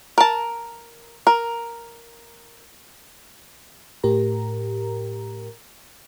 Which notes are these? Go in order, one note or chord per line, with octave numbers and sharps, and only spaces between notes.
A#4 A5
A#4
A2 G4 A#4 A#5